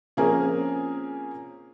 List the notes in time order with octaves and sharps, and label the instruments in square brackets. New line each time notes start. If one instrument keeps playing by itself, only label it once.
[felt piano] F3 A#3 C4 C#4 G#4 A#4